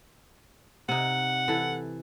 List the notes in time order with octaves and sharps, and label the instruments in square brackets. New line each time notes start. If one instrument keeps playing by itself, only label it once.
[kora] C3 D#4 [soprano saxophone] F#5
[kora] E3 A4